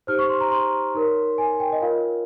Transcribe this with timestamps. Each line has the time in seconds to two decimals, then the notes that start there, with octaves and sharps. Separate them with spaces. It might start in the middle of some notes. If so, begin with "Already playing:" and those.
0.07 D#4 G4 C5 F6
0.19 C#6
0.29 C6
0.41 A#5
0.51 C6
0.95 D#4 A#4 C#5
1.38 G#5
1.60 G5
1.72 D#5
1.82 F4 A#4 C#5 F5